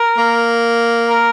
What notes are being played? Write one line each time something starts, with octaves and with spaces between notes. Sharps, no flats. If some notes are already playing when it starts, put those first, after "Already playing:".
Already playing: A#4
A#3
A#4